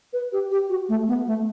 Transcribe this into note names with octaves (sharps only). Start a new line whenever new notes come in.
B4
G4
G4
F#4
A3
B3
A3